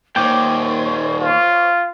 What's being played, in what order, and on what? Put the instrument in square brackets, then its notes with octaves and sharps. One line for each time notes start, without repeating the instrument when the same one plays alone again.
[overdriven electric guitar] D#2 A#2 [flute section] C5 C#5 C#6 [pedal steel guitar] G5 D6
[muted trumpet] F4